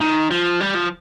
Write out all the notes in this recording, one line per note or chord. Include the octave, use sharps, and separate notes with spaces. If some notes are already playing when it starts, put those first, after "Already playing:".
D#3
F3
G3
F3